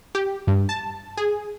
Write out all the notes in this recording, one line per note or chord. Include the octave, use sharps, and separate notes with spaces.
G4
G2
A5
G#4